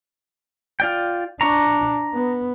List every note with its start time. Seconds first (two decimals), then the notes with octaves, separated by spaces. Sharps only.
0.80 F4 D5 G5
1.41 D4 A#5 C#6
2.14 B3